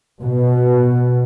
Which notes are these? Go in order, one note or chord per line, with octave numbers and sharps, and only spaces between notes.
B2